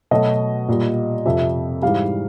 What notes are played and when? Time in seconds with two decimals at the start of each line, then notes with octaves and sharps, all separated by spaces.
0.11 B2 F#3 A3 D#5
0.68 A#2 G3
1.26 F2 C3 F3 E5
1.82 G#2 E3 G3 F5